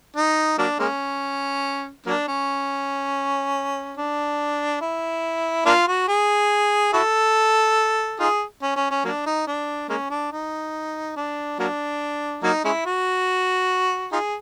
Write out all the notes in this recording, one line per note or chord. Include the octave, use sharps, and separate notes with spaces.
D#4
F#3 A#3 D4
G#3 A#3 C#4
F#3 A#3 D4
C#4
D4
E4
A#3 D4 F4
F#4
G#4
E4 F#4 A4
D#4 F4 G#4
C#4
C#4
C#4
F#3 A#3 D4
D#4
D4
G#3 A#3 C#4
D4
D#4
D4
F#3 A#3 D4
F#3 A#3 D#4
G#3 C#4 E4
F#4
D#4 F4 G#4